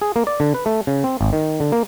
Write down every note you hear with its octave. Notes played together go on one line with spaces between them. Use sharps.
G#4
A#3
D5
D3
B4
A3
C#3
C4
G#1
D#3
D3
A#3